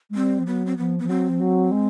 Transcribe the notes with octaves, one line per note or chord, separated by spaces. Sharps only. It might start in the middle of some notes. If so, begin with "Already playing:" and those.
G#3
G3 C4
F3
F#3 B3
C4
F3 B3
F3 B3
F#3 C4
F3
F#3
G#3